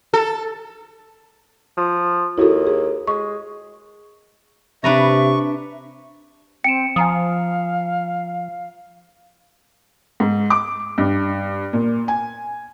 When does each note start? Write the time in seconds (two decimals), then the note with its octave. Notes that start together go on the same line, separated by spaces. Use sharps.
0.14 A4
1.77 F3
2.38 D#2 E4 F#4 A4
2.67 G#4
3.07 G#3 C#6
4.84 C3 D4 B4 E5 A#5 C#6
6.64 C4 G5 C#7 D7 E7
6.96 F3 F5 G#5 A#5 D#6
10.20 G#2
10.50 D6
10.98 G2
11.73 A#2
12.08 G#5